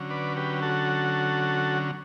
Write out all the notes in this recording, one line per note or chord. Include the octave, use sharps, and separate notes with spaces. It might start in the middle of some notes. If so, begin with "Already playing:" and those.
Already playing: D3 F#3 C#4
B4 D5
G4 B4
F#4 A4